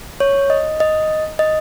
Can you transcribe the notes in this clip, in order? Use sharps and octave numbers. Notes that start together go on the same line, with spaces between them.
C#5
D#5
D#5
D#5